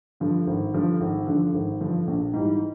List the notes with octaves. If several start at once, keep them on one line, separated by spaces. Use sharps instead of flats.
G2 D3 F3
G#1
G2 D3 F3
G#1
G2 D3 F3
G#1
G2 D3 F3
A#1
G#2 E3 G3